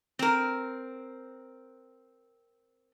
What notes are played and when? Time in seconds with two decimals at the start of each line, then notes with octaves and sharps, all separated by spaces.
0.19 C4 A#4